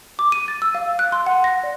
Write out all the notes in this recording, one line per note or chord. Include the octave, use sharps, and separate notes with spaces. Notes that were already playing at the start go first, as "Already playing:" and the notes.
D6
D#7
A6
E6
F5
F#6
C6
F#5
A#6
D5